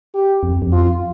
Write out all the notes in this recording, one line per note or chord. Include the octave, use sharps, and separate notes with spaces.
G4
F2
F2
F4